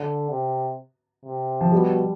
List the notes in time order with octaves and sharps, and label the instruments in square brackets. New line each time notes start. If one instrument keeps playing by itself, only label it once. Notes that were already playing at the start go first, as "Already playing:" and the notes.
Already playing: [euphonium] D3
C3
C3
[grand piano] F3
[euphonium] B2 [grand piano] G3